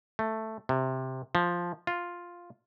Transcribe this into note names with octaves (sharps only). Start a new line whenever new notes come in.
A3
C3
F3
F4